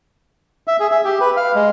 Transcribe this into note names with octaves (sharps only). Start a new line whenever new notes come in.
E5
G#4
E5
G4
B4
F5
G#3